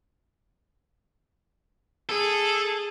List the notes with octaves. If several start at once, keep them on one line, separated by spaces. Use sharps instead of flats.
G#4 A4